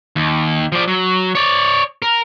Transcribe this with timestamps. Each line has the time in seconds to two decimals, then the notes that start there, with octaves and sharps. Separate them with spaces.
0.16 D#2
0.72 F3 D5
0.88 F#3
1.35 C#5 D5
2.02 A#4